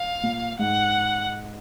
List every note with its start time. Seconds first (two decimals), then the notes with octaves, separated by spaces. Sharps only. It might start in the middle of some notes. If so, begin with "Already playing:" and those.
Already playing: F5
0.23 A#2
0.59 G#2 F#5